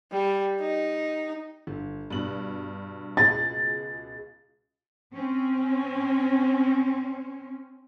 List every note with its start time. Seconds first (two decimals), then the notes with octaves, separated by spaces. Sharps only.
0.12 G3
0.61 D#4
1.67 G1
2.10 G2 B2 F#7
3.17 C#2 B2 G#4 A6
5.13 C4 C#4